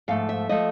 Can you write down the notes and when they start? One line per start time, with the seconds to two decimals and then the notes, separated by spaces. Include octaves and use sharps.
0.08 G#2 F3 A3 F5
0.29 E5
0.49 F3 A3 D#5